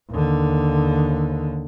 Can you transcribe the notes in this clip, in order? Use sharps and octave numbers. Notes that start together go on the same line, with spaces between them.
D#2 D3